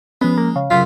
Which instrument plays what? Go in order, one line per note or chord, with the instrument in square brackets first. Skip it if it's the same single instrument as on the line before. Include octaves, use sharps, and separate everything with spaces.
[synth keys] F3 C#4 [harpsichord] G#3 [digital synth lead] B3
[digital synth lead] A#3
[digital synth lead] C#3 [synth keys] F5
[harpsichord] F#2 C#3 [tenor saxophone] F4 [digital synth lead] B6